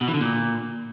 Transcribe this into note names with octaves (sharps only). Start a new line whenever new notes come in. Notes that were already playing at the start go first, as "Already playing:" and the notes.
B2
E3
D3
A#2